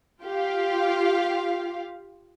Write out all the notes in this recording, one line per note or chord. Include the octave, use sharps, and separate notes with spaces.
F4 G4 F5